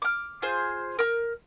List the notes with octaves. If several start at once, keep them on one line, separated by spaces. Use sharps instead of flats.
D6 F6
F4 G#4 C5
A#4 F6